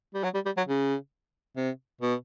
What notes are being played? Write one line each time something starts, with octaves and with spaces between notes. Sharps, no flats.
G3
F#3
G3
G3
F#3
C#3
C3
B2